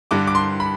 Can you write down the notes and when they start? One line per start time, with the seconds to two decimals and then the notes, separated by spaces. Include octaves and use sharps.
0.11 G2 D3 G3 D6
0.27 D6
0.35 C6
0.60 B5